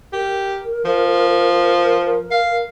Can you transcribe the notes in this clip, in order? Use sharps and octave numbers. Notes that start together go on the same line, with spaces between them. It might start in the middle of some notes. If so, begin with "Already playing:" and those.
G4 A#4
F3
F5